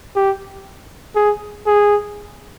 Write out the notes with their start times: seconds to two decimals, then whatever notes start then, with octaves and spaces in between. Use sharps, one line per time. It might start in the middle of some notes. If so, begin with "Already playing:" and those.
0.16 G4
1.16 G#4
1.66 G#4